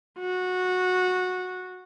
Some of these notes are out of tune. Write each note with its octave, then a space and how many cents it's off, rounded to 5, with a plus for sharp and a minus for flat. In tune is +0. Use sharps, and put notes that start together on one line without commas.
F#4 -15